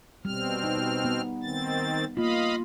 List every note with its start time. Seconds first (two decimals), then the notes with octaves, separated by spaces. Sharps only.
0.25 B2 G3 C4 F6
0.64 D#4
1.04 B3
1.43 D#3 C4 A6
2.17 A#3 F4 D#5 F5 B5